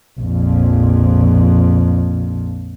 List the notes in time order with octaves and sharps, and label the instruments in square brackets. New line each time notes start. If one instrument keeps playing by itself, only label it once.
[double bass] A#1 F2